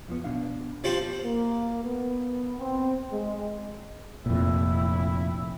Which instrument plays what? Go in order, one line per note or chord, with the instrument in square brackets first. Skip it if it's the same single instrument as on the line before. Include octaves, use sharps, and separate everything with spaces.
[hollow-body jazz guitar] F2 F3 B3
B2 D4 F5
[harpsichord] F3 G3 C5 [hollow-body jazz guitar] C4 F4
[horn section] A#3
B3
C4
G#3
[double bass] F1 E4 [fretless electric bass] F2 A#2